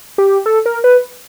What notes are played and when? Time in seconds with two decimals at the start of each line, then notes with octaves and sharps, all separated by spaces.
0.18 G4
0.46 A4
0.66 A#4
0.84 B4